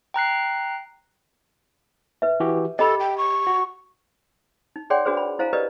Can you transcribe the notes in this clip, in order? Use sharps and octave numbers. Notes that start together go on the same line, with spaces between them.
G5 A#5 F#6 C7
B4 E5
E3 F#4 G4
G4 A4 D#5 B5
G5
C#6
F#4
D#4
G#4 C#5 D5 F#5 G5 C6
D4 F#4 G#4 B4 C5
B5
E4 C5 F5 G#5 A#5
G4 A#4 B4 D5 D#5